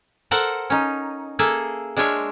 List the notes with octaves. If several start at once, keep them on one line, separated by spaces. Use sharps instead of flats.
A4 A#4 C5 F#5
C#4 D#4
A#3 G#4 A4 E5
G#3 D4 F4 C#5 E5